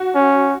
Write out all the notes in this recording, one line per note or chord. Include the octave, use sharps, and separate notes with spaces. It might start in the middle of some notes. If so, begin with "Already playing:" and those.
Already playing: F#4
C#4